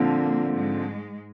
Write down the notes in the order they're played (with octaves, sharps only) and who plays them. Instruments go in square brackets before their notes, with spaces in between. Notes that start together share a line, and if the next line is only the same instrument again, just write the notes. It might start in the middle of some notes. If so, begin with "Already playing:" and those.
Already playing: [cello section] A#2 A#3 [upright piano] D3 F3 C4
[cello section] G#2 G#3